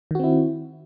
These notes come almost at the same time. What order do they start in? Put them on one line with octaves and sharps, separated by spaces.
D#3 F#4 C4 E4